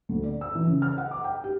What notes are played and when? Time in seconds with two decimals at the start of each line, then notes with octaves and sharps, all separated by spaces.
0.09 D2
0.24 D5
0.41 E6
0.55 E3
0.68 C#3
0.82 F6
0.98 F#5
1.11 D6
1.24 G5
1.44 G4